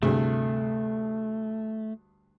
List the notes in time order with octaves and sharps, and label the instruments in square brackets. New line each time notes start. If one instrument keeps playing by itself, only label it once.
[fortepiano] D2 G2 G#4 [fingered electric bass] C3 [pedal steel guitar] A3